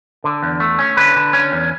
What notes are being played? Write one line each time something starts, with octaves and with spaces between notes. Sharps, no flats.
D3
E2
A3
C#4
D3 B4
D3
C#4
E2